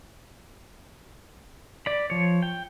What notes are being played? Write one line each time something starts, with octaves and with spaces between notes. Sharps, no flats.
D5 B5
F3 C#5
G5